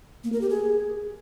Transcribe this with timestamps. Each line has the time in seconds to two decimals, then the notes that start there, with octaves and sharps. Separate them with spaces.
0.24 A#3
0.33 A#4
0.41 G4
0.50 G#4